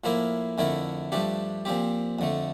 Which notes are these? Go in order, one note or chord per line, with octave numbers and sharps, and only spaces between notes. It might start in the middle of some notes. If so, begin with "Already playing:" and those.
A2 F3 A#3 E4 A#4
F2 D3 A3 E4 A#4
G2 F3 A3 D4 G4
A#2 F3 C4 G4
F2 D3 A3